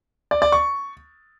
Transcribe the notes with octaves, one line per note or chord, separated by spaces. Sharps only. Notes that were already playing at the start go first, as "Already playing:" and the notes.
D5
D5
C#6